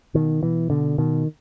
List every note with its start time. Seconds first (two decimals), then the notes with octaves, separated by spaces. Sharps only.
0.14 B2 D#3
0.42 B2 E3
0.70 B2 D3
0.98 B2 D#3